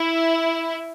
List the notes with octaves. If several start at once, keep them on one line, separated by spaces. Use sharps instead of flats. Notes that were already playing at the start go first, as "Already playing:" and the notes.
Already playing: E4